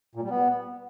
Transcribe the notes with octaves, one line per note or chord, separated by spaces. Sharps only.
A#2
G3
B3